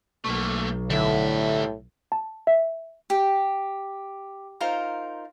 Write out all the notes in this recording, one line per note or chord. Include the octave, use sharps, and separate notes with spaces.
B1 A3 A#3
A2 D3 G3 E5
A5
E5
G4
D#4 F4 A#4 C5